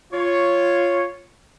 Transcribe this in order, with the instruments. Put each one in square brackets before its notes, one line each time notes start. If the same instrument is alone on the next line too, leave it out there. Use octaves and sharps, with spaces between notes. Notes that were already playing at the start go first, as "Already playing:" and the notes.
[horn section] F4 C#5